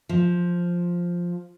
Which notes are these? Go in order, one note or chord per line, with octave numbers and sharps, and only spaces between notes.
F3